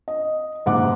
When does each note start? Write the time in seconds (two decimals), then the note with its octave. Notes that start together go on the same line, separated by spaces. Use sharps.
0.08 D#5
0.66 F#1 G#2 F#5 D6